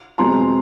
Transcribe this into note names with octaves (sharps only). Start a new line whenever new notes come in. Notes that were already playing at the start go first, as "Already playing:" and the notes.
E2 B2 G#3 C4 A#5 C6